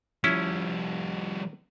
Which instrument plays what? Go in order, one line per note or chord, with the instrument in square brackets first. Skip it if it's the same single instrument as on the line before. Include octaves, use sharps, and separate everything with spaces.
[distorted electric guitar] F3 G3 [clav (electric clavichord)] C#4 E4